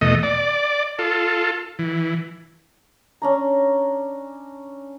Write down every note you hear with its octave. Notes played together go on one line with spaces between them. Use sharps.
E2 B2 A3 D#5
D5
F4 A4
E3
C#4 D4 A#5